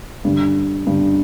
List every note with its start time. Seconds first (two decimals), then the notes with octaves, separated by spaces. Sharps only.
0.25 G2 D3
0.86 G2 D3